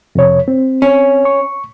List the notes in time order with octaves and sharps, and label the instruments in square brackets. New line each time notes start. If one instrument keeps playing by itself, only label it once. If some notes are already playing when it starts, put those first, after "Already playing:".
[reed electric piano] F2 C3 C#5
C4
[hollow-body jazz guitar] C#4
[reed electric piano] C#6